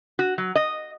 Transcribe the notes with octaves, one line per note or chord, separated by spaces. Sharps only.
F#4
F#3
D#5